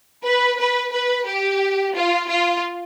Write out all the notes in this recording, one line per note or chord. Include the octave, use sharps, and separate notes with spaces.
B4
B4
B4
G4
F4
F4